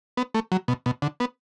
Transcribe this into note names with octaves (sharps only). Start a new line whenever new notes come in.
B3
A3
F#3
B2
B2
D3
B3